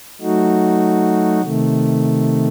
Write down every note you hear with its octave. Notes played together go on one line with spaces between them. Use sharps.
F#3 A3 D#4 F#4
C3 D#3 A3